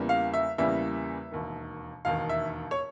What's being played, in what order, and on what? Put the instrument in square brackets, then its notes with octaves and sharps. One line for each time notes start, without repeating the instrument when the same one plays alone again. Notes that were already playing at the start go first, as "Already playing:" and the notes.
Already playing: [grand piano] E2 C#3 E3 G3 A#3
F5
E5
E2 C#3 E3 G3 A#3 E5
E1 D#2 D#3
E1 D#2 D#3 F5
E5
C#5